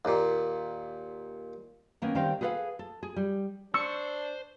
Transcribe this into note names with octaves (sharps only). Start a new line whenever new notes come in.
D#2 A#2
D#3 A#3 B3 C#4
D#3 G3 C4 F5 G5
G#4 A4 B4 C5 F5 F#5
A4
G#4
G3
D4 C5 C#6 E6